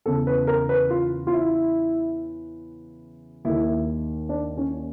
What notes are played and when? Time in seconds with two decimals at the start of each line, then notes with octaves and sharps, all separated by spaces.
0.06 E2 C#3 E3 A4
0.27 B4
0.47 A#4
0.69 B4
0.90 F4
1.27 F4
1.33 E4
3.45 D#2 D#3 E4
4.29 D4
4.57 C#4